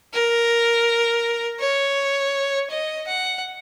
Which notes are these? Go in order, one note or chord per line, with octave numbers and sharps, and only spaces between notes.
A#4
C#5
D#5
F#5